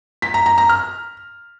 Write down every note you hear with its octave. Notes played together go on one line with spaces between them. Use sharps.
B6
A#5
A#5
A#5
F6